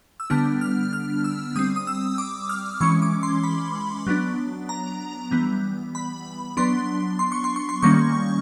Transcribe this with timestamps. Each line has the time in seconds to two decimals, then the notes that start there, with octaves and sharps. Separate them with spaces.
0.20 E6
0.30 D3 G3 B3 D4 F6
0.61 F6
0.93 F6
1.24 E6
1.56 G3 C4 D#6
1.76 D#6
1.87 E6
2.18 D6
2.49 F6
2.81 E3 G#3 C#4 C#6
3.02 D6
3.23 C6
3.44 B5
4.07 F#3 B3 D4
4.69 A#5
5.31 E3 G3 B3
5.95 B5
6.57 F#3 B3 D4 C6
7.19 C6
7.32 C#6
7.44 C6
7.56 C#6
7.69 C6
7.82 D#3 G3 A#3 C#4 C#6